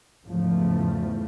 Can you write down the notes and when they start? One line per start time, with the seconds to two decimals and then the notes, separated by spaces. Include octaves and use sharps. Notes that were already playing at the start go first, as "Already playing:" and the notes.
0.23 E2 G#2 C#3 F3 A3